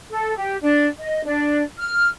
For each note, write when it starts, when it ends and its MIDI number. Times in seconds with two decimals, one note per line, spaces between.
0.09 0.35 69
0.35 0.56 67
0.60 0.86 62
0.98 1.23 75
1.23 1.62 62
1.79 2.08 89